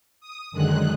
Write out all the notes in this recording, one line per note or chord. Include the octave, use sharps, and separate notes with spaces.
D#6
F#2 D3 D#3 G#3 F#6